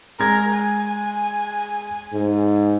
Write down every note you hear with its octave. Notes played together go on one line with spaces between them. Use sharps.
G#3 A#4 G#6
G#5
G#2